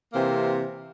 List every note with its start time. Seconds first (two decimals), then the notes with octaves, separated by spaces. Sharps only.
0.13 C3 E3 A#3 C4